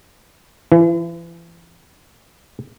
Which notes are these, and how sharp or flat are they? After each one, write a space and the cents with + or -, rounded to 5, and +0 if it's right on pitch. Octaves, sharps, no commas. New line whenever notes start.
E3 +40